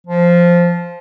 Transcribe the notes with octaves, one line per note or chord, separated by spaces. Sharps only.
F3